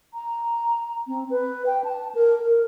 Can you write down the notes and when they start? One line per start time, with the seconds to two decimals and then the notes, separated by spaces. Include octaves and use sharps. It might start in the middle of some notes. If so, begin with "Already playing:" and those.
0.14 A#5
1.08 C4
1.30 B4
1.66 G5
1.84 A5
2.15 A#4
2.45 A#4